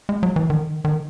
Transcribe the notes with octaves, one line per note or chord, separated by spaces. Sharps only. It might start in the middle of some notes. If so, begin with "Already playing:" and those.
G#3
F#3
E3
D#3
D#3